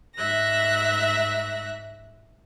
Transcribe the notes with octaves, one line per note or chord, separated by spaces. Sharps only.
G#2 E5 F#6 A#6